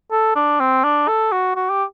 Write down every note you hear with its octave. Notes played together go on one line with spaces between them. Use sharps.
A4
D4
C4
D4
A4
F#4
F#4
G4